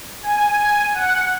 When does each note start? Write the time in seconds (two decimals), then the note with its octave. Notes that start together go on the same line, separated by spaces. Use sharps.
0.23 G#5
0.94 F#5